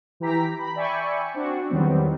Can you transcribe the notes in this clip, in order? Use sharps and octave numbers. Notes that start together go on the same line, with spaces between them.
E3 G4 A#5 B6
B5
D5 E5 G5 G#5 B5 C#6
C4 D4 F#4
E2 D#3 F#3 G3 B3 C4